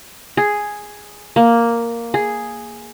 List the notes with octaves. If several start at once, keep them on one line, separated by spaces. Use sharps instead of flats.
G#4
A#3
G#4